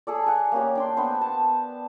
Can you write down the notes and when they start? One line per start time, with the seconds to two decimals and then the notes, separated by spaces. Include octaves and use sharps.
0.07 G#4 A4 D5
0.26 F#5 G#5
0.52 A#3 C#4 G4
0.75 D4 G5 C6
0.97 B3 D4 B4 C5
1.21 A5